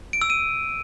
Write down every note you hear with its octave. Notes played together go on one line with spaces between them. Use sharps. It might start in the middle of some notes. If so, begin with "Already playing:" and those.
D7
E6
D#7